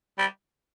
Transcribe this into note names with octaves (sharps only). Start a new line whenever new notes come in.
G3